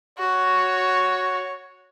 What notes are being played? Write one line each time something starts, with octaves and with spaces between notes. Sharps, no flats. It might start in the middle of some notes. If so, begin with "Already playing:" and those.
F#4 C#5